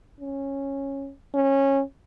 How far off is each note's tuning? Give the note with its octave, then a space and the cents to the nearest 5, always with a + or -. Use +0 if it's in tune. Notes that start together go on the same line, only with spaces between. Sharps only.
C#4 -10
C#4 -20